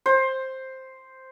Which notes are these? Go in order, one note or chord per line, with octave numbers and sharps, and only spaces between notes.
C5